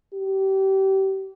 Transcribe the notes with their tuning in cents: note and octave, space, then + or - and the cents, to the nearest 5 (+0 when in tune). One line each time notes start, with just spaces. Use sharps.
G4 -30